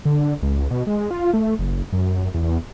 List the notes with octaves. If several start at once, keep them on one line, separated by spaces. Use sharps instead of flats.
D3
C#2
B2
G#3
F4
A3
F#1
F#2
E2